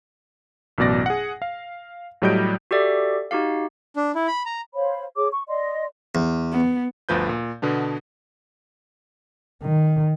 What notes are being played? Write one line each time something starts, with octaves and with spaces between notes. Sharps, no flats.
A1 F#2 B2 D5 A#6
G#4 F#5
F5
A2 F#3 G3 D#5 G6 D7
F#4 G4 A4 D5 E5
D#4 F#4 G4 F5
D4
E4
B5
A#5
C5 C#5 F5 B5
G#4 C#5 D6
C#6
D5 D#5 C6
E2
B3
G1 D2 F3 B4 G6
A#2
B2 D3 B3 D4
D#3